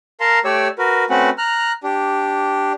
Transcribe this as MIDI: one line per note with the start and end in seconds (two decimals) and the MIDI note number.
0.20 0.39 70
0.20 0.39 77
0.20 0.39 81
0.20 0.39 82
0.20 0.39 84
0.45 0.68 57
0.45 0.68 67
0.45 0.68 73
0.45 0.68 74
0.45 0.68 88
0.78 1.05 66
0.78 1.05 70
0.78 1.05 71
1.10 1.30 57
1.10 1.30 60
1.10 1.30 61
1.10 1.30 66
1.10 1.30 71
1.10 1.30 78
1.38 1.72 82
1.38 1.72 89
1.38 1.72 90
1.84 2.73 62
1.84 2.73 67